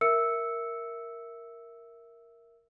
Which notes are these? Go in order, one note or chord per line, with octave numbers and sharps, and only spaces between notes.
A#4 E5 E6 C#7